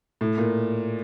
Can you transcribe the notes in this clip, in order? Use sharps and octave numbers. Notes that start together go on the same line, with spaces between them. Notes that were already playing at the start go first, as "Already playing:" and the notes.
A2
A#2